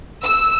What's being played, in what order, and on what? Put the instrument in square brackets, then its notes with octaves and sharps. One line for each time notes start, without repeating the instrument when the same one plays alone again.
[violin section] E6